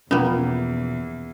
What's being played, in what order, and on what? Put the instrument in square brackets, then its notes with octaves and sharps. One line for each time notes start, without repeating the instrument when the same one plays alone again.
[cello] E2 [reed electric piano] B2 F3 [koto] A#3 B3 [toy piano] C#4 F4